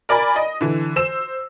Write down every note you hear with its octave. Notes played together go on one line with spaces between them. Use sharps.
A#4 D5 G#5 B5
D#5
D3 E3
C5 E6 E7